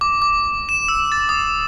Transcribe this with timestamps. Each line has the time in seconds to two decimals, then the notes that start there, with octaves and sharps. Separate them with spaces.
0.01 D6
0.22 D6
0.69 E7
0.88 E6
1.12 A6
1.29 D#6